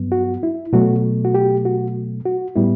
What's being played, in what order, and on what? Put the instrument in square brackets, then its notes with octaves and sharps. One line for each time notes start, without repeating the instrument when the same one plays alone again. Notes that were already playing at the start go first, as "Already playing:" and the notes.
Already playing: [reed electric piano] G2 F#3 B3
F#4
E4
B2 F#3 A3 F#4
F#4
G4
F#4
F#4
A2 G3 B3 E4